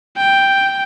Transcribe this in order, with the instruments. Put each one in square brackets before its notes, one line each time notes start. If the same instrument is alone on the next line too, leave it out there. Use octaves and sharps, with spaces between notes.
[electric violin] G5